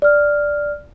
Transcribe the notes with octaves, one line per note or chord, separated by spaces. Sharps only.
D5 F6